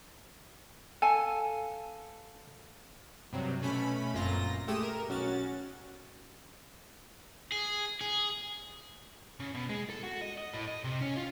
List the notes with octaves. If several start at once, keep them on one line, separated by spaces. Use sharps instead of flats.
A4 F5 G#5
G2 C3 F#3
B2 A3 C#4 B5
G1 F#2 A#2 C4 F4 A#6
G#3 A3 G4 D#6 E7
A#4
B1 C#4 F#4 A6
G#4
G#4
C#3
B2
G#3
A4
F#4
D#5
D#5
A2
D#5
C3
C#4
F4